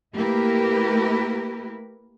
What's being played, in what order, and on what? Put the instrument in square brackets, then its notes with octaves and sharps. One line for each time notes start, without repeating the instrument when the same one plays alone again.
[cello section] A3 A#3 E4 G4 A#4 B4